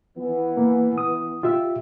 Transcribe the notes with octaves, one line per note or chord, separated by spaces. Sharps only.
E3 B3
A#3
D#6
F4 G4 E5